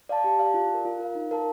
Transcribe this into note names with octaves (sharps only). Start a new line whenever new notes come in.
D5 F5 A5
G4
D5 F5 A5
F4
A#4 F5
F4
A#4 F5
D#4
A#4 F5 A5